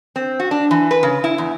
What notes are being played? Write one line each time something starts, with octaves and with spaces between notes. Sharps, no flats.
C4
F#4
D4
E3
B4
C#3
E4
E2